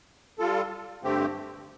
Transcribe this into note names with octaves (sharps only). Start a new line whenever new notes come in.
G3 F4 A4
G2 D3 A3 C4 G4